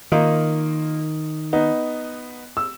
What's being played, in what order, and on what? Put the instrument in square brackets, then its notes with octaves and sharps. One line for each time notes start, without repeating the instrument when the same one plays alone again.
[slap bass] D#3 [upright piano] A#3 D#4 F4
[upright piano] B3 D#4
E6